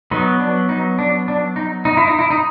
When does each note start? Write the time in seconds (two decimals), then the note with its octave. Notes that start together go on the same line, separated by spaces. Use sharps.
0.11 F#3 B3 D#4
0.40 D4
0.69 D#4
0.99 D4
1.28 D4
1.56 D#4
1.85 D#4
1.97 E4
2.07 D#4
2.19 E4
2.31 D#4